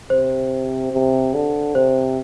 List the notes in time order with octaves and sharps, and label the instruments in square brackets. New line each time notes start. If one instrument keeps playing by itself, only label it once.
[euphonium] C3 [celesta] C5
[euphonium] C3
D3
[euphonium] C3 [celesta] C5